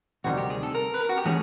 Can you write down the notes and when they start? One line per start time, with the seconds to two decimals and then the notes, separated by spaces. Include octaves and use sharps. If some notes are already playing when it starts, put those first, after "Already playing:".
0.24 D2 C3 D#3 G3 F#4
0.37 G4
0.50 G#4
0.63 A4
0.74 A#4
0.94 B4
1.00 A#4
1.09 F#4
1.17 G4
1.25 E3 A3 C#4 G#4